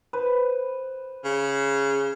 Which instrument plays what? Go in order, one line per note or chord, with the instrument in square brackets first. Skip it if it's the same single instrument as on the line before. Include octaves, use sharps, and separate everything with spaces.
[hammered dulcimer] B4 C5
[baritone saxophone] C#3